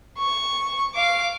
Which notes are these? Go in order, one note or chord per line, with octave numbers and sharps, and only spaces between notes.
C#6
F5 D6